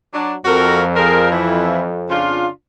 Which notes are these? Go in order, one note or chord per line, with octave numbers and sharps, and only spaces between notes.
F#3 D4
F2 F#4 A4 A#4
C4 G#4 A#4
E3 E4
C#3 D4 F4